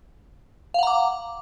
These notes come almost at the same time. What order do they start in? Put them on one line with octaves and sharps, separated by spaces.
F5 F#5 A#5 D6